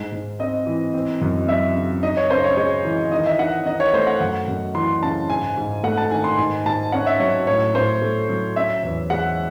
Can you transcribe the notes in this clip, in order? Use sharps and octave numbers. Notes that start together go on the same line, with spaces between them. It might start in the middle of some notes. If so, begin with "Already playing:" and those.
Already playing: G#2 G#3
G#2
C4 D#5
E3
C4
F#2
F#3 E5
C#3
D#4 D#5
C#5
C#3 C5
C#5
G#3 C#5
E3
D#3 D#5
E5
D#3 F#5
D#4 D#5
C#5
A3 C5
F#5
F#2 F#5
F#2
E3 C6
C#3 A5
G#2 G#5
G#2
A3 F#5
A5
D#3 G#5
C6
G#2 G#5
G#2 A5
C#4 F#5
E5
F#3 C#5
A2 C#5
A2 C5
A3
F#3
C#4 E5
E2
G#3 F#5